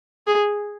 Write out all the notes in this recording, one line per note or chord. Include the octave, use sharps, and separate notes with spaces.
G#4